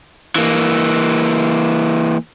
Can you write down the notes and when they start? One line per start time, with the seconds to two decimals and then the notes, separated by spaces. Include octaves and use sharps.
0.35 E3 A#3